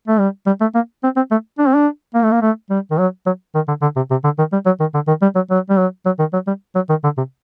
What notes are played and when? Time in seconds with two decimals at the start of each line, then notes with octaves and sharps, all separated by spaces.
0.08 A3
0.19 G3
0.47 G3
0.61 A3
0.75 A#3
1.04 C4
1.16 C4
1.31 A3
1.59 D4
1.67 C4
1.75 D4
2.15 A#3
2.23 A3
2.32 A#3
2.42 A3
2.70 G3
2.91 D#3
2.98 F#3
3.26 F#3
3.55 D#3
3.68 D3
3.82 D3
3.96 C3
4.11 C3
4.24 D3
4.38 D#3
4.52 G3
4.66 F#3
4.80 D#3
4.94 D3
5.08 D#3
5.22 G3
5.36 F#3
5.50 F#3
5.70 G3
5.78 F#3
6.06 F#3
6.19 D#3
6.33 F#3
6.47 G3
6.75 F#3
6.89 D#3
7.04 D3
7.17 C3